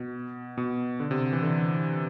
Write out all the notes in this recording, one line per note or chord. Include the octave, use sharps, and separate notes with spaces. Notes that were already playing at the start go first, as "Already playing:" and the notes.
Already playing: B2
B2
D3
C3
E3
D3